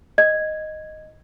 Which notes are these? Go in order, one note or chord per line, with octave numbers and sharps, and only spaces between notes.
D#5 G#6